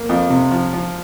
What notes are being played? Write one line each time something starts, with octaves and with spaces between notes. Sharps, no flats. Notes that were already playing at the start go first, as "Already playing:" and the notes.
Already playing: A#3
F2
C3
F3
F3